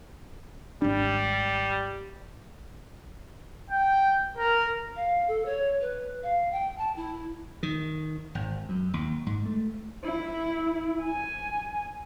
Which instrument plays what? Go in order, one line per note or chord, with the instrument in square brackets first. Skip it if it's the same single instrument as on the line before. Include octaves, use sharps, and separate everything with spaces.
[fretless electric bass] G#1 D4 [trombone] G3
[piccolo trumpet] G5
A#4
[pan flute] F5
A4
C#5
B4
F5
G5
A5
E4
[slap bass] D#3
G#1
F#2
D#2
G#2
A3
[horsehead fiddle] E4
G#5